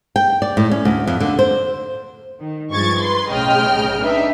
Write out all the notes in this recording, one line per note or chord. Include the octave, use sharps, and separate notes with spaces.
G5
D5
A2
C#4
D2
F2
D3
C5
D#3
G2 F3 G#3 C#6 G#6 A6
B4 C6
B1 A2 C#3 D#5 G5 F6
D4 D#4 B4 E5